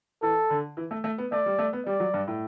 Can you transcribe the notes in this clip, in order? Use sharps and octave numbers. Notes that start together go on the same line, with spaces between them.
E3 A4
D3
E3
A3
A3
B3
A3 D5
G3
A3
B3
G3 D5
F#3
G2
A2